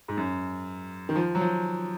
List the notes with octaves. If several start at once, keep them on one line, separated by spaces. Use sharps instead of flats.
G#2
F#2
D#3
F3
F#3
F3